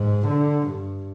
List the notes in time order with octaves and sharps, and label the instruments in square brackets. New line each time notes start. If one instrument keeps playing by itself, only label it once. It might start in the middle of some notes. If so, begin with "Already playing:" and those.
Already playing: [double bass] G#2
D3
G2